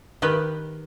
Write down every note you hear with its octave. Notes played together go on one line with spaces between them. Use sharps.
D#3 G4 B4